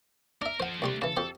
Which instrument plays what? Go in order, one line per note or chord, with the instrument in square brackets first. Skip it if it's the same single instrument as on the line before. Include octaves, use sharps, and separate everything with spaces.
[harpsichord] D4 E5 [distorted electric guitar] A#4
[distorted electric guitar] F3 A4 [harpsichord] C5 F#5
[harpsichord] C2 G3 C6 [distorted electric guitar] A3 D4
[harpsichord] C#3 E3 [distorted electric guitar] A4
[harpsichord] F2 G4 C5